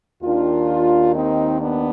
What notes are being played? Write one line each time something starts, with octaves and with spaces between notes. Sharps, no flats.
D#2 D#3 D4 F4
C4 D#4
B3 D4